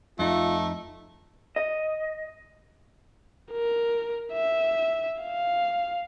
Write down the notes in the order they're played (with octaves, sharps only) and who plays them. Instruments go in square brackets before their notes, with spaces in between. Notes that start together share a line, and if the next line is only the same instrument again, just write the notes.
[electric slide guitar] F2 D#4 [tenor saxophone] A3 [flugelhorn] F4
[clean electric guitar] D#5
[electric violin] A#4
E5
F5